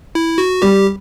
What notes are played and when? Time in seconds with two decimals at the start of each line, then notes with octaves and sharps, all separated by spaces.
0.15 E4
0.38 F#4
0.62 G3 G4